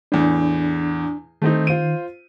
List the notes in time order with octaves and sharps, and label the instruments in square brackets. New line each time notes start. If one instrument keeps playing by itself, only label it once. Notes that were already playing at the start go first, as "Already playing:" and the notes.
[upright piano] E2 A2 [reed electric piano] D4
[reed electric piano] D#3 [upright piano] A3 C4 D#4
[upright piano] F4 C5 D#7